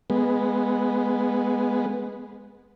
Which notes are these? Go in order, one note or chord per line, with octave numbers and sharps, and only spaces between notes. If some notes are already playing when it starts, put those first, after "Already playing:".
G#3 B3